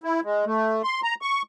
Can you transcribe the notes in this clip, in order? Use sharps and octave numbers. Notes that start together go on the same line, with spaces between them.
E4
G#3
A3
C6
A#5
C#6